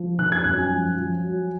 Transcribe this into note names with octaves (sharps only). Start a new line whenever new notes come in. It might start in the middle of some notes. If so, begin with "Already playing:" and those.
Already playing: F3
D#3 F#6
G#6
F#2 F#6
G#5
F3
F3
F#3